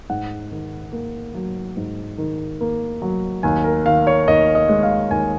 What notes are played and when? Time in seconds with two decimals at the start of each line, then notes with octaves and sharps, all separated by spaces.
0.10 G#2 F#5
0.51 D#3
0.93 A#3
1.35 F#3
1.77 G#2
2.18 D#3
2.61 A#3
3.02 F#3
3.43 D#2 G#5
3.64 A#4
3.86 D#3 F5
4.07 C#5
4.28 D#2 D#5
4.55 D#5
4.69 G#3
4.83 F5
5.10 D#2 G#5